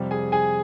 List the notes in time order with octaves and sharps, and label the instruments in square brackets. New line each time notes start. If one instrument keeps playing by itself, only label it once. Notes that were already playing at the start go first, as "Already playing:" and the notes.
Already playing: [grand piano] F2 C3 G3 C4
G#4 G#5
G#4 G#5